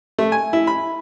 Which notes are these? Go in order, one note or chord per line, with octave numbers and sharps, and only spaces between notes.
A3
G#5
E4
B5